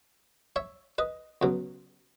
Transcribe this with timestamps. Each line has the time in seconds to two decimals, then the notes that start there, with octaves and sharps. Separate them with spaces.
0.56 C#5 E5
0.98 B4 D#5
1.42 C#2 B2 F#3